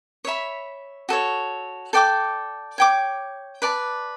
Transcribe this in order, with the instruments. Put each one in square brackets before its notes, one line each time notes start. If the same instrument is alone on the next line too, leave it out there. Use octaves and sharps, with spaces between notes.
[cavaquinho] C#5 E5 B5
F#4 A4 C#5
A4 D5 G5 D6
C#5 G5 D6
B4 D5 A5